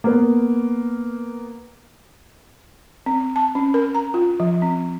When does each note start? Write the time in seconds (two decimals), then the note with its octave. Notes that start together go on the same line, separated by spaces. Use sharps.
0.04 A#3 B3
3.06 C4
3.36 A5
3.55 C#4
3.74 A#4
3.95 A#5
4.14 F4
4.40 F3
4.62 C4